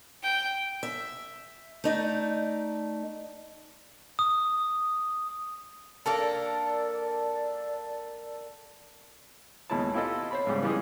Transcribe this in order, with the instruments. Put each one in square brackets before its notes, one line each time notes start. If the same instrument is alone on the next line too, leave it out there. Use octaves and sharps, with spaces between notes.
[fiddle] G5
[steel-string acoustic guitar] E5
A3 D#4 D5
[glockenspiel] D#6
[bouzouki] A#3 D4 A#4 [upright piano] A4 [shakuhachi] D5
[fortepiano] D#2 B2 G#3 E4 C#5 A5
C4 E4 F4 G4 A4 D#5
C5 C#5 B5
G#2 C#3 G3 G4
E3 F3 G3 G#3 C#4 G#4